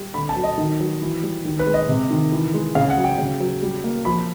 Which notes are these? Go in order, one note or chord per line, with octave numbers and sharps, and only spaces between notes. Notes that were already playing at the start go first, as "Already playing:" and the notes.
Already playing: G3
D3 B5
A5
F#3
D#5
D#3
F#3
E3
G3
D#3
B4
G#3
D#5
C3
D#3
E3
G#3
C#3 F5
F#5
F#3
G5
C#3
F#3
G3
A#3
F3 B5